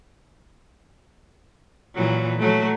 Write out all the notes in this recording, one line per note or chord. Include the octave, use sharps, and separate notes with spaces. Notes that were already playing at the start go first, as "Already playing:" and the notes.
A#2 E3 F#3
F#3 A3